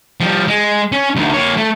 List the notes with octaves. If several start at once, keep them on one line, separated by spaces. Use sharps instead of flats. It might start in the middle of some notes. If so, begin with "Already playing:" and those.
F3 G3
G#3
C#4
D2 D#3
A#3 C#5
A3